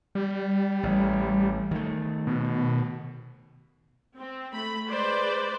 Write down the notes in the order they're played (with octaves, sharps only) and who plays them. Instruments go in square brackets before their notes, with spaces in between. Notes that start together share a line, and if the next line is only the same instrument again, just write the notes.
[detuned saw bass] G3
[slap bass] A1
D#3 A3
[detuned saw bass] B2
[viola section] C4
A3 B5
G#3 B4 C5 D5